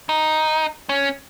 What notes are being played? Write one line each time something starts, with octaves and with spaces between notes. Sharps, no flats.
D#4
C#4